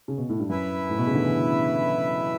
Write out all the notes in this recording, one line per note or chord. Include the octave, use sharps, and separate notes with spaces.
C#3
B2
A2
G2
F#2 E4 B4 E5
A2
B2
C#3
D3
E3